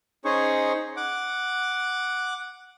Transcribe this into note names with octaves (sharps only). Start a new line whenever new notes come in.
C#4 D#4 G#4 C5 C#5 C#6
F#5 D6